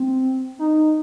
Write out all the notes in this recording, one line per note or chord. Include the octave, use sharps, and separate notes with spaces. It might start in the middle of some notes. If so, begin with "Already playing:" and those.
Already playing: C4
D#4